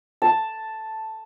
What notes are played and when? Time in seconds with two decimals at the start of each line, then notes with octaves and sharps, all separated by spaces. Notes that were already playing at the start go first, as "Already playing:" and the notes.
0.22 A5